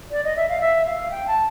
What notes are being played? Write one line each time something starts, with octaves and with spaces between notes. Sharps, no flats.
D5
D#5
E5
F5
E5
F5
G5
A5